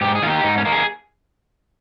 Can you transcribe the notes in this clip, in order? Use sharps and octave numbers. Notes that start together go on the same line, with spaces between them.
G#2 G4
G#4
D#3 A#3 F4 G4
G#2 D#4
C#4
D#3 A#3
G#4